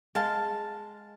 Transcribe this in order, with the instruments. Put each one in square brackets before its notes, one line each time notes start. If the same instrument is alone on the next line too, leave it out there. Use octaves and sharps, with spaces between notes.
[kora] G#3 [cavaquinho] F5 A5